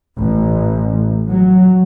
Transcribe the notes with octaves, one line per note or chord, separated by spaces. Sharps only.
A1
F#3